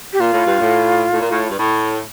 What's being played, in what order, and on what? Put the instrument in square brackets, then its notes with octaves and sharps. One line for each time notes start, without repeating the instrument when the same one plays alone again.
[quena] G4
[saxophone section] A#2 [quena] F4
[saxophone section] A2
G2
A2
A2
A#2
A2
G2
A2